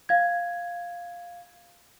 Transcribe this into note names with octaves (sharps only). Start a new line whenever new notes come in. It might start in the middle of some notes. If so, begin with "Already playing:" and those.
F5 G#6